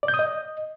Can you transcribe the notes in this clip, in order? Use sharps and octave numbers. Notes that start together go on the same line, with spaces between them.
D5
G6
D#6
D#5